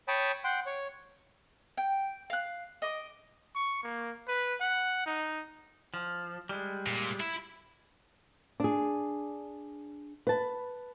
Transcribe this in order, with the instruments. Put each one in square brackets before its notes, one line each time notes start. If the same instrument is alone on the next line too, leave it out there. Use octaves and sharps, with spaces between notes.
[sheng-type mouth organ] C#5 G5 A5 B5 D#6
F#5 G5 C6
C#5
[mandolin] G5
F5 F#6
D#5 D6
[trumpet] C#6
A#3
B4
F#5
D#4
[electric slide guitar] F3
G3 G#3
[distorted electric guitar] A#2
E4
[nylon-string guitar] D4 G#4
B4 A5